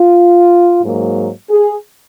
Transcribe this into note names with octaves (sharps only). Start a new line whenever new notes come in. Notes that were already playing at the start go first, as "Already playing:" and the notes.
Already playing: F4
G#2 F#3 A#3
G#4